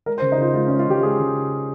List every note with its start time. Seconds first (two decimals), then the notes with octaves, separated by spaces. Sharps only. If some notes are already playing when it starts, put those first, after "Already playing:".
0.06 G#3 A#4
0.18 C5
0.22 C#3
0.32 D#4
0.38 C#3 F4
0.54 G#3 F4
0.67 C#4
0.70 G#3
0.79 F4
0.87 C#3 G4
1.03 G#3 G#4
1.19 C#3